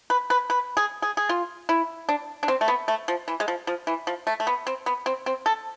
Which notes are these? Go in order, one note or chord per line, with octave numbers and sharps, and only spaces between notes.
B4
B4
B4
G#4
G#4
G#4
F4
E4
D4
D4
C4
A3
B3
A3
F3
E3
G#3
F3
F3
E3
F3
A3
A3
B3
C4
B3
C4
C4
A4